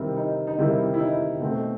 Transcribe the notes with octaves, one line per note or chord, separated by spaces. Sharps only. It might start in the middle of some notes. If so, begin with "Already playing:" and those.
Already playing: C3 D#3 G3 C4 E4
D#4
D#4
C3 D#3 G3 C4 E4
E4
D#4
B2 A3 C4